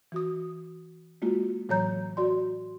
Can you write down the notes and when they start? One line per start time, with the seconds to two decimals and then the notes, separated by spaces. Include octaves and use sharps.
0.12 E3 F#4 D#6
1.22 G#3 A#3 F4 F#4
1.69 A2 E3 F#3 C#5 A#5 G6
2.17 F#4 D5 C6